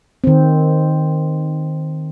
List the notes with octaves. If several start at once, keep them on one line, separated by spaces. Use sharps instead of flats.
D#3 C4